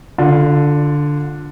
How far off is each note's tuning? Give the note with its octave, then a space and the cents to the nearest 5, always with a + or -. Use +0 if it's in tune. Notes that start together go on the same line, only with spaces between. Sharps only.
D3 +0 F4 +15